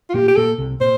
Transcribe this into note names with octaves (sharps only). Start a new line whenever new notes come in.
F4
A#2 A#3 G4
G4
A#2 A#3 A4
C2 C3
A#2 C5